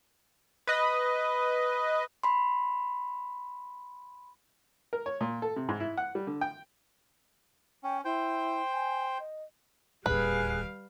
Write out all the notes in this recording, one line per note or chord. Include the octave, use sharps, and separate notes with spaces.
B4 D#5
B5 C6
A#4
C#5
A#2
A4
C3
G#2
E4
F#5
G3
D3
G5
C#4 G5
E4 C5 G5
G#5
D#5
D1 D#2 G3 G#4 B4 F5 F#6